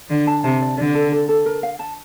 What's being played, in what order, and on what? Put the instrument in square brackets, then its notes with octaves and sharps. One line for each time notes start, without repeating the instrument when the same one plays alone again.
[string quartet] D3 [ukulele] D5
[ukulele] A5
[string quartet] C3 [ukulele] A5
[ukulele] D5
[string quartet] D3 [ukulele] D5
[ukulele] A4
A4
A4
A#4
F5
A5